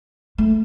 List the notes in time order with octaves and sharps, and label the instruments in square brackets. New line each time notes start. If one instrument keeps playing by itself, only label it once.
[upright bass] A3